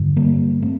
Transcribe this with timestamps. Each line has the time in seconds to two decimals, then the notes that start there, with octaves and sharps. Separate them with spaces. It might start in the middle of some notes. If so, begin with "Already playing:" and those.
Already playing: G2 D3
0.16 G3 A#3
0.62 A3 C4